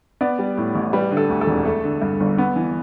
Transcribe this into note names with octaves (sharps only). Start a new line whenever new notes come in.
B3 D5
G3
A2
A1
G3 B4
D3
A4
D2
A4
E1
A3
D3
G2
G1
B3
E3